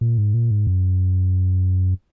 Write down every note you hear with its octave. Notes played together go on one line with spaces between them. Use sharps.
A#2
G#2
A#2
G#2
F#2